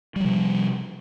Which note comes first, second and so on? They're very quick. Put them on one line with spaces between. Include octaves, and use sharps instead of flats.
G3 F3 C3